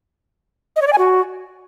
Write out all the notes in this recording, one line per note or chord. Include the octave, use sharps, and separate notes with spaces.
D#5
C#5
D5
G#5
F#4